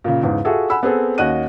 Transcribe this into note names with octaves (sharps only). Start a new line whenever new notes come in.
A#2 C#3
E2 G#2 C#3
F4 F#4 G#4 A4 E5
F#5 G#5 B5 E6
B3 C4 G#4 A4
D#2 C#4 F#4 D#5 F#6 D#7